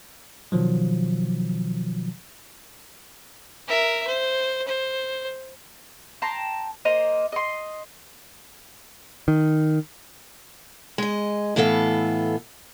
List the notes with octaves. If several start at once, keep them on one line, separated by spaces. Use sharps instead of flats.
B2 D#3 F3 F#3
A#4 E5
C5
C5
G5 A5 A#5 C6
A#3 C5 D#5 A#5
D#5 C6
D#3
G#3 D#5
A2 E3 B3 A4 F5